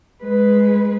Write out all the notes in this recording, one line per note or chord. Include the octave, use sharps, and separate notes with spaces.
G#3 B4